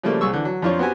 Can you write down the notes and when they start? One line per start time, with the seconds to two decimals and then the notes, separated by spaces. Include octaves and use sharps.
0.03 C#3 F3 G3 A3 A#3
0.21 C2 G#4 C#6 E6
0.33 D3 E3
0.45 F#3
0.62 F2 D4 F4 C5 C#5
0.79 B3 C4 F#4 G4 G#5